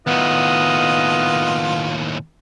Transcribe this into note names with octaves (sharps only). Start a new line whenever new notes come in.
D#2 A2 B3 F4 D#5